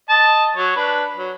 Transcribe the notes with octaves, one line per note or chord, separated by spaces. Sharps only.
D#5 A5
F#3 C#5
D4 B4
F#3